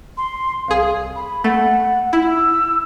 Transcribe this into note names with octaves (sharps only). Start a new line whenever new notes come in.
C6
C2 G#4 F5
B5
A3 F#5
E4 E6